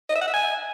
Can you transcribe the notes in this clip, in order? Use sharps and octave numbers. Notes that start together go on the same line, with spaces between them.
D#5
E5
F#5
E5
G#5